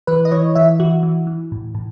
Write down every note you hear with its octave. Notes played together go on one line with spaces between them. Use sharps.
E3 B4
D#5
E3 C#5
E3 E5
E3 F#4
E3
E3
A2
A2